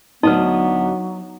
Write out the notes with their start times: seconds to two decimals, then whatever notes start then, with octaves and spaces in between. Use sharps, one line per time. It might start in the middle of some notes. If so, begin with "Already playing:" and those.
0.23 D2 C3 F#3 B3 D#4 B4 D#5